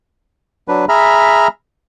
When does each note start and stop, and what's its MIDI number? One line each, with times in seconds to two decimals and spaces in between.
0.68 0.85 54
0.68 0.85 62
0.68 0.85 71
0.89 1.48 68
0.89 1.48 76
0.89 1.48 82
0.89 1.48 83
0.89 1.48 89